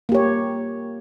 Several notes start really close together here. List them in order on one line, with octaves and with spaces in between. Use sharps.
A#3 G4 C#5